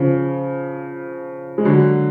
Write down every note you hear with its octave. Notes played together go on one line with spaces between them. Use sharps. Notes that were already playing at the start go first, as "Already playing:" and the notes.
Already playing: C#3 F3
G#3
D3 F#3